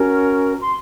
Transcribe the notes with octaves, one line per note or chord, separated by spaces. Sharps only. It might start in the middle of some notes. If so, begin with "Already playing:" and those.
Already playing: C#4 F#4 A#4
C6